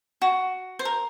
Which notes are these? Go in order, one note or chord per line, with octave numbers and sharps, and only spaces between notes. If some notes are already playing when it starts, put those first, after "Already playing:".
F#4
C5
A#4